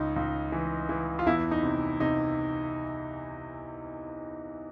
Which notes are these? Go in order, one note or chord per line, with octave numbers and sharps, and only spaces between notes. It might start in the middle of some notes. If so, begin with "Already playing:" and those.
Already playing: C#2 D#4
C#2
E3
E3
F4
E2 E4
D#4
C3
C3 D#4